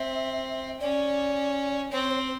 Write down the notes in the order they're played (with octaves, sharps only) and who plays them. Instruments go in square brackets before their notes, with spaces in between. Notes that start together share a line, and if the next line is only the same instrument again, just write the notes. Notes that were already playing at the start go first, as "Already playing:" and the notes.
Already playing: [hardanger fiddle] C4 [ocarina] E5
[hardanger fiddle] C#4 [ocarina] D5
[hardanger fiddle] C4 [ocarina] C#5
[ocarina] C5